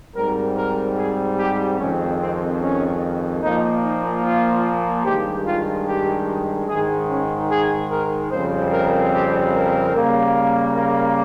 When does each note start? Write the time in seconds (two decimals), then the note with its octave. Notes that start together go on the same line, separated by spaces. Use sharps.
0.15 G#2 G3 C4 A#4
0.56 A#4
0.97 G#4
1.37 G4
1.78 F2 D#3 G#3 C4 C#4
2.19 C4
2.60 C#4
3.42 A#2 F3 A#3 D#4
3.82 D#4
4.22 F4
5.04 G2 D#3 G#3 G4
5.45 F4
5.86 G4
6.67 G#2 D#3 G#3 G#4
7.09 C#4
7.49 G#4
7.90 A#4
8.31 F2 C#3 G3 C4 C5
8.71 A#4
9.12 G4
9.53 A#4
9.93 C#3 G3 A#3
10.75 A#4